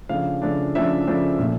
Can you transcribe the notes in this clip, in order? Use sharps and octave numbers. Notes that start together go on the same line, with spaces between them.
C#3 F3 A3 D4 F5
C#3 F3 A3 D4
C#3 F3 A3 D4 E5
C#3 F3 A3 D4
A#2 F3 A3